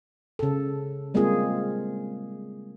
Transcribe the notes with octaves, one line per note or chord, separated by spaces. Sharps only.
C#3 A4
G3 G#3 A#3 C4 F4 G#4